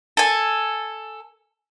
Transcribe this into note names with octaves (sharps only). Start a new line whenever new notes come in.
A4 G#5